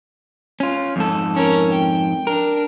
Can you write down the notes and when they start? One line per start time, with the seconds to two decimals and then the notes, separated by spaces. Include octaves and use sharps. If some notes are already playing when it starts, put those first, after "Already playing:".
0.60 C#4 F4
0.96 F2 G#2 A4
1.35 C#4 A#4
1.73 G5
2.27 D4 A#4